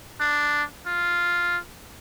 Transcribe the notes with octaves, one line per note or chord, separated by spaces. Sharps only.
D4
F4